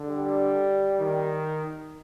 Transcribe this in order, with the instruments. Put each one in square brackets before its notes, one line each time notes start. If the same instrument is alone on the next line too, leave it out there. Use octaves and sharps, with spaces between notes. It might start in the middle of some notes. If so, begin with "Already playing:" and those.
Already playing: [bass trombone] D3
[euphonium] G3
[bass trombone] D#3